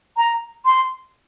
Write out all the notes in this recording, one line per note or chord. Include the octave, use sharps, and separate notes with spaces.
A#5
C6